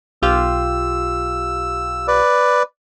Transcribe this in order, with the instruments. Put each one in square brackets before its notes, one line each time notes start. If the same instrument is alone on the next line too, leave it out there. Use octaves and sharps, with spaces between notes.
[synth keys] B1 F4 G4 [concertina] E6
[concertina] B4 D5